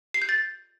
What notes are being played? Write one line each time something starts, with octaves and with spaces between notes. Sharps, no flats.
C7
G6
A6